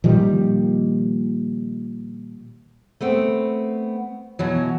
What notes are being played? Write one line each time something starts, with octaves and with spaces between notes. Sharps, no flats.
A#2 D#3 F3 G3
A3 B3 C4
B2 E3 F#3